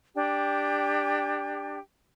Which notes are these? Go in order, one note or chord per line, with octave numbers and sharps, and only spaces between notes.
D4 G4 G5